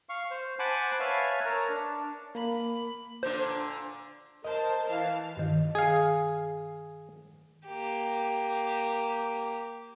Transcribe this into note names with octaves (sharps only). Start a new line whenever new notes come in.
F5 C#6
C5
C5 F#5 G#5 A5 B5 D6
B4 C#5 E5 F5 G#5 A5
A#4 C#5 A5 A#5
D4
A#3 B5
A#2 D3 D4 C5
A#4 C5 D#5 A5
E3 F5 A5
G2 D#3
G#4 F5
A#3 G4